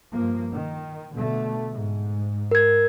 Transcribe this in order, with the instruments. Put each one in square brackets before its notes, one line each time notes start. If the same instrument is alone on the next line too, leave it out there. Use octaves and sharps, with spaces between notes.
[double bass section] G2 F3 A#3
D#3
B2 D3 A3
G#2
[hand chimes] A#4 G#6